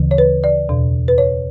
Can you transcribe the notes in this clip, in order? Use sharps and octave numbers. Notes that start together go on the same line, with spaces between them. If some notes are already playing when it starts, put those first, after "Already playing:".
Already playing: D2 C#3 E3
C#5
B4
D5
E2 B2
B4
C#5